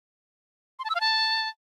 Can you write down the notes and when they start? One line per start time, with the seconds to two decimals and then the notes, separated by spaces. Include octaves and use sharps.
0.79 C6
0.84 A5
0.90 E6
0.95 F5
1.00 A5